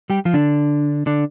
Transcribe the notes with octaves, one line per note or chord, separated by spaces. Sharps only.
G3 G4
F3 F4
D3 D4
D3 D4